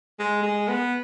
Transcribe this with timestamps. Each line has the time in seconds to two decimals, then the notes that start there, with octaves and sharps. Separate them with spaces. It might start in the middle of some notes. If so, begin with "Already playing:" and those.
0.19 G#3
0.43 G#3
0.68 B3